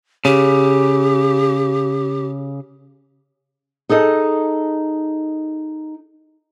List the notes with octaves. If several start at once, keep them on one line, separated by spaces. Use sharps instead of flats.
C#3 G4
D#4 G#4 A4 D#5